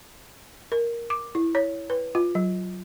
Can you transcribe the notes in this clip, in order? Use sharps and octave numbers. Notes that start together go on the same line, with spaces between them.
A#4
D6
E4
C#5
B4
F4
F#3